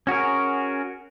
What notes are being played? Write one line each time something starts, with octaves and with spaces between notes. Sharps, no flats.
C#4 F#4 G#4 A#4